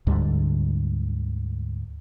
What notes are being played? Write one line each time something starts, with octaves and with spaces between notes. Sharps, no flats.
D2 G#2 D3 G3